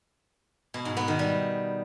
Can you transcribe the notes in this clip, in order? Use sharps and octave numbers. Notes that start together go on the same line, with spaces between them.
B2
G#2
B3
D#3
G3